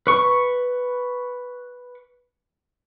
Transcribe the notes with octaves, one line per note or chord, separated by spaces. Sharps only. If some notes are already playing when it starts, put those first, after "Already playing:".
B4 C#6